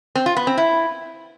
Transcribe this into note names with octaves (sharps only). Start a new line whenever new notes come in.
C4
F4
B3
C4
E4